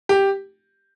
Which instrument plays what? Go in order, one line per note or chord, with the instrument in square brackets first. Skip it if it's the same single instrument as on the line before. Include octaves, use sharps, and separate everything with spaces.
[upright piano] G4